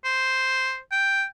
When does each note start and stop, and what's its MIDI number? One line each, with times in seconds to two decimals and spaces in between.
0.05 0.79 72
0.92 1.25 79